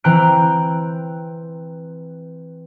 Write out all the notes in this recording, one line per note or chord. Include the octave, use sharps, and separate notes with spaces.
E3 C4 G5 A#5 F#6 D7